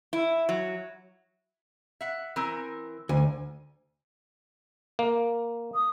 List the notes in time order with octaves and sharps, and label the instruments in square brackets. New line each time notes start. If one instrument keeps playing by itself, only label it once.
[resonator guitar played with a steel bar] E4
F#3
E5 F#5
E3 C4 A#4
[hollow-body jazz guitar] D2 [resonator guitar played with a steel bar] G#5
[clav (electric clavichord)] A#3
[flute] D#6